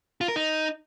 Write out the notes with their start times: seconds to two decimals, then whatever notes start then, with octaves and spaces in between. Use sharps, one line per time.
0.21 F4
0.28 A#4
0.36 D#4